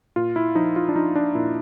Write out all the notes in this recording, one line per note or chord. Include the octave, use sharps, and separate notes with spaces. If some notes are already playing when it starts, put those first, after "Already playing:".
A#2 F4
E4
F3 D#4
F4
D4
F3 D#4
D4
A#2 E4